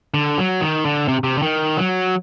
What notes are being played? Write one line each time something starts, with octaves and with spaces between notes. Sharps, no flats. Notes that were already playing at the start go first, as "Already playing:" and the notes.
D3
F#3
D#3
D3
C3
C3
D3
D#3
F#3